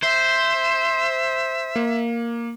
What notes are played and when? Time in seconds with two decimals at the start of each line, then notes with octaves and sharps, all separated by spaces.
0.03 C5 E5
1.76 A#3